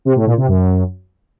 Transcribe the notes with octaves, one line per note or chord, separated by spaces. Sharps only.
C3
A2
A#2
C3
F#2